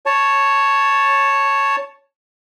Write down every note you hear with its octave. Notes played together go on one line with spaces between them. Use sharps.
C#5 A5